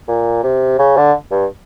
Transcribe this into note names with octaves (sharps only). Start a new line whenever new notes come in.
A#2
C3
C#3
D3
G2